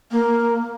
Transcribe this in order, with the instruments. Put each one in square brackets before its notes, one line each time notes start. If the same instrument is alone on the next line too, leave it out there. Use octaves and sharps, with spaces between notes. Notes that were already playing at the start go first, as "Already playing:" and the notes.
[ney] A#3